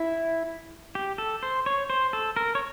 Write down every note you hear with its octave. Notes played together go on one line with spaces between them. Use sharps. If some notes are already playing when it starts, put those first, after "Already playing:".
Already playing: E4
G4
A4
C5
C#5
C5
A4
A#4
C#5